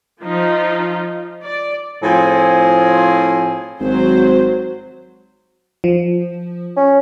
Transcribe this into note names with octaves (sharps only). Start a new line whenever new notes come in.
F3 D#4 F4
D5
A2 F3 C4 G#4 G#5
G#1 F#3 C5
F3
C#4